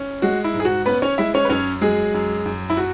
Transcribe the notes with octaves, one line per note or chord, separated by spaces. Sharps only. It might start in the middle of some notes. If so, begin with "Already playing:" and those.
Already playing: C#4
G#3 F#4
E4
G#2
G#4
F#4
B3 C#4 B4
C#4 C#5
G#3 E4 E5
C#4 C#5
B4
F#2 C#4 C#5
F#3 G#3 G#4
F#2
F#2
E4
F#3 F#4